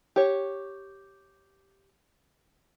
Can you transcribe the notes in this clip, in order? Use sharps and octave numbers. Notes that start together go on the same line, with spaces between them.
G4 C#5